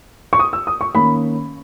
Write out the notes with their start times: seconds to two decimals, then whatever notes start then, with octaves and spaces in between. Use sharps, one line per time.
0.33 C#6
0.39 D#6
0.53 E6
0.67 D#6
0.81 C#6
0.95 D#3 A#3 C#4 B5